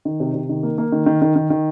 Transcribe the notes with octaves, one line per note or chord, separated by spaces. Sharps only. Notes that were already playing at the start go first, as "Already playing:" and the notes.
D#3
C3
C3
D#3
A#3
A#3
D#3
D#3
D#3
D#3
D#3